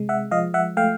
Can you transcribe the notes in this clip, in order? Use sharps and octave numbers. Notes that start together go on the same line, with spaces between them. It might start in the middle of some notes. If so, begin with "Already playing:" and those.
Already playing: C3 G#3
E5 F#5
F3 D#5 F5
E5 F#5
A3 F5 G5